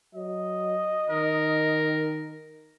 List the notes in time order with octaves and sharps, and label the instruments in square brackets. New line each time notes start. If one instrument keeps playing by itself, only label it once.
[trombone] F#3 [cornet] D#5
[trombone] D#3 [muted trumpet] A#4